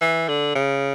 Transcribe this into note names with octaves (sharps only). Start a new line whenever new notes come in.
E3
D3
C#3